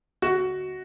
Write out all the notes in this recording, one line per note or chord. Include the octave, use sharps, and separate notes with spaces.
F#4